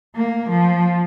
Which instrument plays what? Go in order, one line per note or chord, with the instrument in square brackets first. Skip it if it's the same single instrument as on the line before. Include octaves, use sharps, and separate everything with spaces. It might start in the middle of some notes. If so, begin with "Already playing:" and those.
[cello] A#3
F3